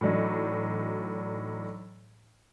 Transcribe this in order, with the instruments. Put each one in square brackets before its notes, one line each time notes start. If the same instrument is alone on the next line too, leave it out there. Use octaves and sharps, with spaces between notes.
[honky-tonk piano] A2 E3 F#3 D4 D#4